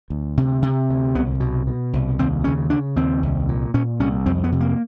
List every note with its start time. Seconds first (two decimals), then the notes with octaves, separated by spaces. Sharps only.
0.10 D2
0.37 C3
0.62 C3
0.89 D2
1.15 C2 B3
1.40 B2
1.67 B2
1.93 C2
2.19 D#2 C4
2.44 C#3 C#4
2.70 C#3 D4
2.96 D#2 C4
3.23 C2
3.49 A#2
3.74 A#2 C#4
4.00 C2 C#4
4.26 F2 C4
4.44 B3
4.52 C3
4.61 A#3